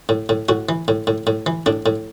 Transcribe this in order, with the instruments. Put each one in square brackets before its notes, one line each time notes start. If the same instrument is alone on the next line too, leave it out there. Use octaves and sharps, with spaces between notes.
[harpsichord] A2
A2
A2 F#4
E3
A2
A2
A2
E3
A2 D4
A2